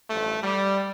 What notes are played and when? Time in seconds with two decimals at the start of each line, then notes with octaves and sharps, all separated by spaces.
0.10 A1 G2 F3 A3
0.43 G3